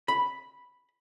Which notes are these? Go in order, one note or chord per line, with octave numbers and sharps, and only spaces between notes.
B5